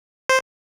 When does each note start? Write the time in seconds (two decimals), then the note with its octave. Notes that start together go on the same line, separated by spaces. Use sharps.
0.29 C5